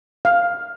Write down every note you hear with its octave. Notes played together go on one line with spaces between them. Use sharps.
F5